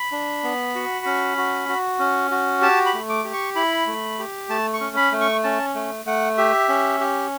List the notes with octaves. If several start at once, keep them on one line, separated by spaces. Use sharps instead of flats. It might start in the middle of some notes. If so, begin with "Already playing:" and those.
Already playing: B5
D4
B3
F#4
C#4
F#4
F#4
C#4
F#4
G4 A5
B5
A3
D6
G4
C#6
E4 B5
A3
G4
A3 A5
C#6
C#4
B5
A3
C#6
C#4 A5
A3
A3 F#5
G4 E5
C#4
G4